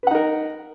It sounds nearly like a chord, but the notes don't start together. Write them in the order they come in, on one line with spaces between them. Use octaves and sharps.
B4 F#5 D#4 A#4